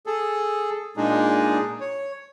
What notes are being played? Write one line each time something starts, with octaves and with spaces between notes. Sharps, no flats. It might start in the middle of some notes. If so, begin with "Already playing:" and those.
G#4 A4
A#2 G#3 D4 D#4 G#4
C#5